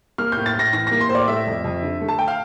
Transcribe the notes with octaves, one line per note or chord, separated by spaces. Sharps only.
A#3 F6
A2 G6
A6
A2 A#6
E3 A#6
A#6
A#3
C6
A2 C5
D5
A3 E5
F2
F2
D3
A3
A5
G5
F5